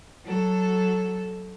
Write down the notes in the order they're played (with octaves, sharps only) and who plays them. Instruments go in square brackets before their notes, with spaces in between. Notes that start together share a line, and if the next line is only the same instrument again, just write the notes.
[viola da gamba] F#3 A4